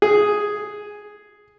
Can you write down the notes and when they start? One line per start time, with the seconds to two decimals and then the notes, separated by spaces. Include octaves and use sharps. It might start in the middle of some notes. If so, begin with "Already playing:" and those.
0.02 G#4